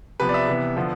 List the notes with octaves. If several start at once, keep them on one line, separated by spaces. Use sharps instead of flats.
C3 F3 B3 B4
D5
E5
C3 E3 B3
D3 F3 B3